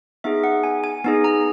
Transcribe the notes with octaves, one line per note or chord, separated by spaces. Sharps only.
B3 D#4 G#4 E5
F#5
G#5
G#5
B3 D#4 G#4 G#5
A#5